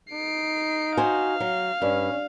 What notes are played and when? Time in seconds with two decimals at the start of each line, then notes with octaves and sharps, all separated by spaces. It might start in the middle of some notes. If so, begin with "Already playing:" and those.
0.13 D#4 C7 D7
0.97 F#4 C5 F5 G#5
1.40 F#3
1.82 G2 C#4